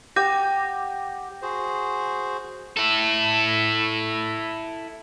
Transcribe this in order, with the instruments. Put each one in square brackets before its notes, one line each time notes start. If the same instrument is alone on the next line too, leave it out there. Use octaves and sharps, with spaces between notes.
[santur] G4 F#5 [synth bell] D6 G6 A#6
[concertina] F#4 G#4 C5
[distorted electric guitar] E4 A4